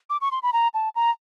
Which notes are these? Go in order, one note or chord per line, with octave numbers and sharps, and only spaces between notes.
D6
C#6
C6
B5
A#5
A5
A#5